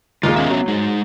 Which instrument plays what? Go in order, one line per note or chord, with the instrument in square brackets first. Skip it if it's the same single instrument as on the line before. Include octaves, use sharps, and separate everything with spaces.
[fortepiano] D#2 A#2 G#3 [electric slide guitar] F4
[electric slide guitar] B3 C#4 E5
[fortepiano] F#3
[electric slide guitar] G#3 D#4